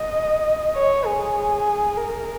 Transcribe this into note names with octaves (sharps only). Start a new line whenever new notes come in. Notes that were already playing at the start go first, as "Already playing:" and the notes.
Already playing: D#5
C#5
G#4
A#4